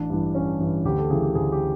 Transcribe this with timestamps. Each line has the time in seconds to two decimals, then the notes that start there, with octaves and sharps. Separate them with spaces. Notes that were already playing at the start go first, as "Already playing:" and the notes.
Already playing: A1 D4
0.10 G2 E3
0.35 A1 C#4
0.60 G2 E3
0.85 D2 G4
0.98 A4
1.10 C#3 E3 G#4
1.22 G4
1.35 D2 G#4
1.52 G4